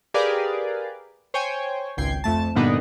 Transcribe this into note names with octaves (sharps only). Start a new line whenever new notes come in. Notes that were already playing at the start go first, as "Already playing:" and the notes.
G4 G#4 A#4 B4 D5 F5
C5 C#5 G5 G#5
G#1 C#2 G5 G#6 C7
F2 A3 A5
G2 A#2 D3 B3 D4 D#4